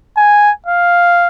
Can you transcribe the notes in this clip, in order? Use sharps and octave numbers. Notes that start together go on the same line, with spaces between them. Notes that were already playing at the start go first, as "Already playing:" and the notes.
G#5
F5